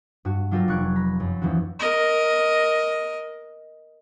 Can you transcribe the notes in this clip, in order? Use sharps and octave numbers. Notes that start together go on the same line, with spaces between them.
G2 F#4
F#3 D4 F4 G4 A4 A#4
F1 C#6 F#6 G#6 D7
A#5 B5
F#2
D#2 E3 F3 C#4 F#4
A#4 D#5